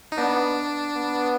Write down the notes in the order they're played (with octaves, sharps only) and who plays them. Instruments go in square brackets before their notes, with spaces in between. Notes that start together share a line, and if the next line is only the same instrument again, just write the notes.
[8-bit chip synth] D#4
[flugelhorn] B3 [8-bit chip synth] D4
[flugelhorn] B3